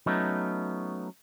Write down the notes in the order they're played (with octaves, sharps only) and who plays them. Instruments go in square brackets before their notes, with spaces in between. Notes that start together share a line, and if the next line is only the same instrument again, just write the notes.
[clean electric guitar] F#3 A3 B3 C#4 D#4